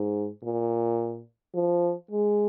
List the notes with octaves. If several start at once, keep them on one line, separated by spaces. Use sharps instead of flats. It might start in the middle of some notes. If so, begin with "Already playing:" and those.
Already playing: G#2
A#2
F3
G#3